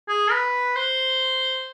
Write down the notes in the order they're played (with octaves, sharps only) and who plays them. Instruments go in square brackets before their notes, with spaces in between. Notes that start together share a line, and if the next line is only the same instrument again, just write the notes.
[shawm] G#4
B4
C5